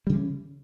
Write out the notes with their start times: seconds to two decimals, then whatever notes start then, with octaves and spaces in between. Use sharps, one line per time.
0.07 G3
0.09 C#3
0.12 E3
0.15 C#4